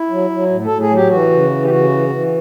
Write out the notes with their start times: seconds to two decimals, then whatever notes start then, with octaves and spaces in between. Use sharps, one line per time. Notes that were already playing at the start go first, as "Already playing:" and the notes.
Already playing: E4
0.10 F#3
0.30 F#3
0.50 A2
0.65 A4
0.70 A2
0.80 G#4
0.90 F#3 G4
1.09 E3 F#4
1.30 C#3
1.50 E3
1.63 G4
1.69 C#3 F#4
1.90 E3
2.09 E3